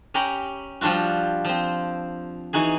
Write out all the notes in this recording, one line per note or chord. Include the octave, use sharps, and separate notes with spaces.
C#4 G4 G5 A#5 B5
F3 G3 D4 F4 F#4
F3 C4
E3 D#4 F#4 G#4